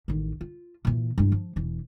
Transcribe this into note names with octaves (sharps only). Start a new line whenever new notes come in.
A1 D#3
F4
A#2 E3
G2 E4
F3
E1 E3